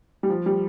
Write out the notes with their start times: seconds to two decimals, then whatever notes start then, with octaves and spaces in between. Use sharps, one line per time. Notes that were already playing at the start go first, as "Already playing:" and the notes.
0.23 G3
0.30 F3
0.46 G3